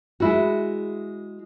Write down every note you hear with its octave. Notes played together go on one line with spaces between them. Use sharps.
G#3 E4 F#4